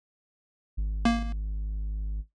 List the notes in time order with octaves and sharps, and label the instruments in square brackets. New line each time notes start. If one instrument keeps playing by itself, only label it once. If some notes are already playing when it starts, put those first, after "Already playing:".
[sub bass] G#1
[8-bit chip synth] A#3